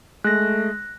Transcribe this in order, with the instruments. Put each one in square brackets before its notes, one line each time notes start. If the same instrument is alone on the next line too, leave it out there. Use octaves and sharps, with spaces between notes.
[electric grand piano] G#3 [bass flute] A3 [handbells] F#6 A#6